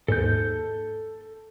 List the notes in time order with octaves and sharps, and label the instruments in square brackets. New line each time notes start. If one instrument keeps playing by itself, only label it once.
[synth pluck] D#2 G#2 [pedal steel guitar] A4 G6